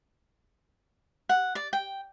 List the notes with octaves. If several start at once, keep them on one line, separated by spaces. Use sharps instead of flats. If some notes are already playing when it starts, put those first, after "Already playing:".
F#5
D5
G5